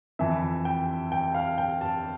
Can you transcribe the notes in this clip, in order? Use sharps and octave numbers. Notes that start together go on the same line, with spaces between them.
F2 E3 E5
G5
G5
F5
G5
A5